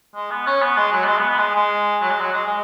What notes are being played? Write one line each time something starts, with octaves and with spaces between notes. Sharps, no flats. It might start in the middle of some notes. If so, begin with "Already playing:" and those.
G#3
B3
C#4
B3
G#3
F#3
B3
G#3
B3
B3
G#3
G#3
F#3
G#3
F#3
G#3
G#3